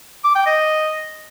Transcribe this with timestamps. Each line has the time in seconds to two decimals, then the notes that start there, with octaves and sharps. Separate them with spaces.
0.24 D6
0.35 G5
0.46 D#5